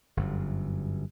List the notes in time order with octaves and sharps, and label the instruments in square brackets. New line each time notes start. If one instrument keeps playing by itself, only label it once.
[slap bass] G1 F#2